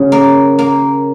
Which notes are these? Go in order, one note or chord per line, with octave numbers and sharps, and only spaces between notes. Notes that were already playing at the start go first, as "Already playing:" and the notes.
Already playing: C#3 F#3
A#3
A#3